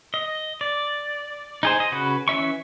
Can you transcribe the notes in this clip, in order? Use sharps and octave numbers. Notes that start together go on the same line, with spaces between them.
D#5
D5
D#4 G#4 C5
D#5
C#3 F#4 B4
E3 C#4 E5 C#6